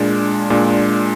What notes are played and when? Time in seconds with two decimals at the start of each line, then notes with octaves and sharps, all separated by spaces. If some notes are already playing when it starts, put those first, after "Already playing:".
Already playing: A#2 G#3 D4
0.50 A#2 G#3 D4